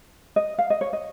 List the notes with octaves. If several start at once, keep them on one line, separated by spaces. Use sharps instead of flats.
D#5
F5
D#5
C#5
D#5